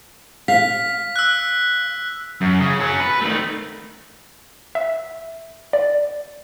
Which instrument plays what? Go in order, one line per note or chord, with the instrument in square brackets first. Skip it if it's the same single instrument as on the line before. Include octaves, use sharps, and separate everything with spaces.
[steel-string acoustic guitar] F5 [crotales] B6
[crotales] E6 F#6
[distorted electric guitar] F#2
C#3
F#3 C#4
B4
D#3 A3
[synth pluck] E5
D5